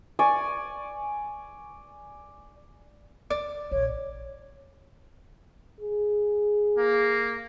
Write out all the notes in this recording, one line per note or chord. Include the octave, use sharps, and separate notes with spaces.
D5 G#5 C#6
D2 D5
A#1 C3 C#5
G#4
A#3